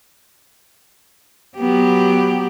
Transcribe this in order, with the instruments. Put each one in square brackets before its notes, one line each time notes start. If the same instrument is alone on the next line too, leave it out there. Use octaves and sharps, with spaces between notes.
[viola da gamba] F#3 B3 G4